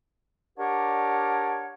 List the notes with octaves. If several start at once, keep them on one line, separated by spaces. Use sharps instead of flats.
D4 G4 A#4 C#5 D5 F#5